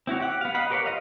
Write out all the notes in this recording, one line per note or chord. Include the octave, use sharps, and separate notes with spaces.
C4 E4 F#4 C#5
G4 F#5
B3 F5
D#5 F5 F#5 B5
G4 A#4 B4 C#5
F4 C5 D#5 F5